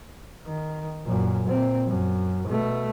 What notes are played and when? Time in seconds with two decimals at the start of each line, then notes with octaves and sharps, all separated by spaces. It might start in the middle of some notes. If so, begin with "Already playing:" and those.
0.46 D#3
1.06 F#2 A#2
1.48 A#2 C4
1.87 F#2
2.48 B2 A3